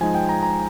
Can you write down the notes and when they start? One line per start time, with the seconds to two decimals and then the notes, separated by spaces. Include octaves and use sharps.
0.01 F3 G#3 D#4 G#5
0.15 G5
0.29 A#5
0.43 A#5